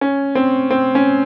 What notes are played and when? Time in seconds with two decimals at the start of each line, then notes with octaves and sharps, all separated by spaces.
0.01 C#4
0.35 C4
0.70 C4
0.95 C#4